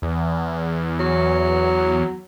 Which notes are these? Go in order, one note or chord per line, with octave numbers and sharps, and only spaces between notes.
E2
F#3